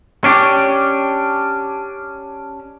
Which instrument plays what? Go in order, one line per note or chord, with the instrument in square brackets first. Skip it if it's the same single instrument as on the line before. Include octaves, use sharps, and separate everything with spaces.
[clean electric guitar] C#4 D4 G4